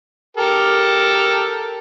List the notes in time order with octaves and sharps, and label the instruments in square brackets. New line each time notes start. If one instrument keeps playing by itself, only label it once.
[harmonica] G4 A4 A#4